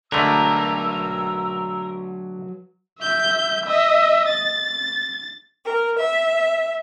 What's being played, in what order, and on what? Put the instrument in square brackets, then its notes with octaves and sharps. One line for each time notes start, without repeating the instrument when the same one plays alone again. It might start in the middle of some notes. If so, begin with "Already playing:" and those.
[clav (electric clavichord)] D3 G#3 A3 [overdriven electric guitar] F#3 B4 [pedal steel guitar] A#4 [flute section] E6
[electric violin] E5 G6
D#5 E5
A6
[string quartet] A#4
E5